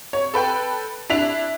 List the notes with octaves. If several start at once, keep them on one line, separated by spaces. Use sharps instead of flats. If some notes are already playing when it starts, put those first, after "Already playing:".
C#5
A4 B4 G5
D4 E4 B6 F7